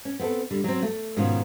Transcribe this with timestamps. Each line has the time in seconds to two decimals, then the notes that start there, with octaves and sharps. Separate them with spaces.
0.05 C#4
0.20 B3 C4 E4 A4
0.51 D3 G3
0.64 F#3 C4
0.83 A3
1.17 G#2 B2 D#3 C#4 F4